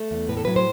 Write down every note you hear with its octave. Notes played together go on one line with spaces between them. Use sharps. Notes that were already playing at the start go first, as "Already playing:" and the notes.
Already playing: A3
E2
A2 B4
A4
F#3 B4
C5